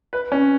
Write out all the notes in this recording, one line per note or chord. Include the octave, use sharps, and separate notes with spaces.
B4
C#4